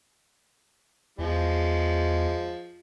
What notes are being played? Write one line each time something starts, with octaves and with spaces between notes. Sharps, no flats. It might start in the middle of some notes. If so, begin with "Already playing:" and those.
E2 F3 G#3